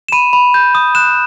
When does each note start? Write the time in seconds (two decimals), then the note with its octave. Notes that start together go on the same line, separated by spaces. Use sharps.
0.09 E7
0.12 B5 D#7
0.33 B5
0.54 G6
0.75 D#6
0.95 F#6 E7